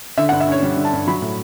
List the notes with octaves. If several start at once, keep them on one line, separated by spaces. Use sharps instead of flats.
D3 E5
F#5
G2
E5
C#4 C#5
G3
D3
A5
G2
F#3 B5
A2